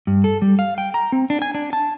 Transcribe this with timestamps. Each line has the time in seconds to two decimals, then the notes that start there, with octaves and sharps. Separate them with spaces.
0.07 G2
0.24 A4
0.42 G3
0.59 F5
0.78 G5
0.94 A#5
1.12 C4
1.30 D4
1.42 G#5
1.55 D4
1.73 A5